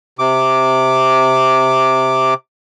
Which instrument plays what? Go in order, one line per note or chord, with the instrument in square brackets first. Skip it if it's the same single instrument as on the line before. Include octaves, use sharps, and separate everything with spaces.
[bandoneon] C3 D6